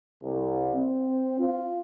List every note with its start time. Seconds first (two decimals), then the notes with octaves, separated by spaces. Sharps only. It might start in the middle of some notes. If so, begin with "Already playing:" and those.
0.23 C2
0.74 C4
1.40 F4